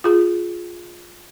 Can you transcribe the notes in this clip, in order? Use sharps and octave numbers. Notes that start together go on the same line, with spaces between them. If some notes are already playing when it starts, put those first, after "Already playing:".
F4 G#4